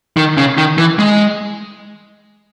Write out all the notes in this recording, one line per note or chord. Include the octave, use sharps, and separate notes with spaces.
D#3
C#3
D#3
E3
G#3